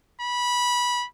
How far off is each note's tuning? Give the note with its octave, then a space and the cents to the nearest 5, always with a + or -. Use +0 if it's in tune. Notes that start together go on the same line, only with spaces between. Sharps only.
B5 -15